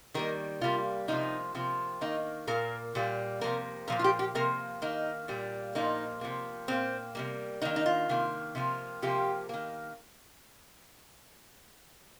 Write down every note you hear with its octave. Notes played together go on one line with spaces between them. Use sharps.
D#3 G3 A#3 A#4
C3 G3 A#3 F4
C3 F3 A#3 D#4
C3 F3 A#3
D#3 A#3 D#4
A#2 A#3 A#4
A#2 G3 A#3
C3 F3 A#3 A#4
A#2 F3 A#3 A#4
F4
G4
G4
C3 F3 A#3 A#4
D#3 A#3 D#4
A#2 G3 A#3
A#2 F3 A#3 D#4
C3 F3 A#3
A#2 A#3 C4
C3 G3 A#3
D#3 A#3 D#4
D#4
F4
C3 D#3 A#3
C3 F3 A#3
C3 F3 A#3 G4
D#3 A#3